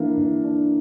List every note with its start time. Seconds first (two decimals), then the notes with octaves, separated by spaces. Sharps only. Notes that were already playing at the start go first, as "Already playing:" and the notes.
Already playing: E3 A#3 D4
0.18 E3
0.44 D4